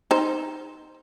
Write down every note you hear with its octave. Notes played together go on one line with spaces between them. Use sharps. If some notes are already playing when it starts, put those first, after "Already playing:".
D#4 C5